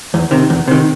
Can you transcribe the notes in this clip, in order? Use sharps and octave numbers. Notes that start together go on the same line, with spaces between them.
E2
C3 D#3
E2
C3 D#3